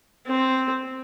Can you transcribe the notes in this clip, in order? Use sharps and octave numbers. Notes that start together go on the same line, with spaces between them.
C4